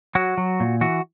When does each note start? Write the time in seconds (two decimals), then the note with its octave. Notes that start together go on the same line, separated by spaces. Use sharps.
0.15 F#3 F#4
0.38 F#3
0.60 A#2
0.81 E3 F#4